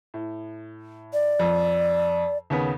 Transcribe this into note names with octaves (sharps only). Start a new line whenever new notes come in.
A2
D5
F2
D#2 C#3 B3